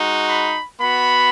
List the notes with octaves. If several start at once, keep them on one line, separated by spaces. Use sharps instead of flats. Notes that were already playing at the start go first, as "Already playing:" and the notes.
Already playing: G#3 D#4 F#4
B5
B3 F#4 B5